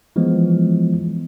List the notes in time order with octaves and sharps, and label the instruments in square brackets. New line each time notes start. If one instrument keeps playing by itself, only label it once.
[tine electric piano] E3 F3 G#3 B3